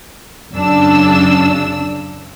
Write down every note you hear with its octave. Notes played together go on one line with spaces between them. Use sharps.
F#2 C#3 D4 E6